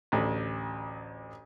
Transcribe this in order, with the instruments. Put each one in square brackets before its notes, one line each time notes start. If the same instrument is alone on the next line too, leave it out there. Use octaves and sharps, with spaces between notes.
[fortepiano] A1 D2